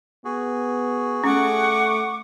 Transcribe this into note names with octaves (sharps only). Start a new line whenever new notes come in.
B3 F#4 G#4
A3 C#4 F#5 C#6 D6